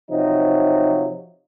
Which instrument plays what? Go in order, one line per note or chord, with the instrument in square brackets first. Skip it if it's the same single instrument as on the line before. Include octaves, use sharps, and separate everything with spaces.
[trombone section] C3 F3 F#3 D#4